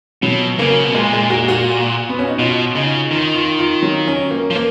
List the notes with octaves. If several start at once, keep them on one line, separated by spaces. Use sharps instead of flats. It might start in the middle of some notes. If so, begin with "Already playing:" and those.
B2 F#3
C#3 A#3
B2
A#2 G#3
G#3
F#4
F#4
B3
C#4
D#4
B2 F4
C#3 D#4
D#3 F4
F4
F4
F#3
C#4
A#3
F3
A#3